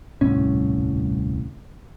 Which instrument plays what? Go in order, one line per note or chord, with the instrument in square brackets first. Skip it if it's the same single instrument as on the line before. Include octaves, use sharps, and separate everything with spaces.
[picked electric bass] D#1 C2 A2 C#4